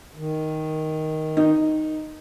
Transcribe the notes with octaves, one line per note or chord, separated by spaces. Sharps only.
D#3
D#4